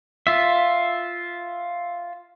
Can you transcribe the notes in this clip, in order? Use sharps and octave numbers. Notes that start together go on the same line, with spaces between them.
F4 E5